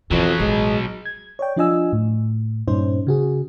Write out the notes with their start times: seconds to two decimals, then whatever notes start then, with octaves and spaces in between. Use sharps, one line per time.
0.11 F2 B2 E3 F#3
0.40 A1 G#3
1.05 G#6
1.39 C#5 D5 G5
1.56 F3 D4 F4 D#5 G#5 E6
1.93 A2
2.68 G2 A#2 C#4 D#4 C5
3.07 C#3 F#4 G#4